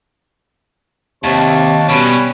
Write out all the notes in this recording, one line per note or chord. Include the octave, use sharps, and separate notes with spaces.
D#2 C3 C#5 A5
B2 G3 C#4 B4